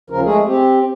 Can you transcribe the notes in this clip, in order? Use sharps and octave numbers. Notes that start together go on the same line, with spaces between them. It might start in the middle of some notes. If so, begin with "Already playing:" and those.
D#2 C#3 F3 A#4
G#3 A3 G#4
C4 G4